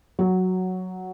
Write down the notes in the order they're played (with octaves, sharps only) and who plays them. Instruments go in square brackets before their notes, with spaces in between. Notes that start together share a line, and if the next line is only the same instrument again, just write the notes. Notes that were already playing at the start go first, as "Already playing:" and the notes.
[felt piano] F#3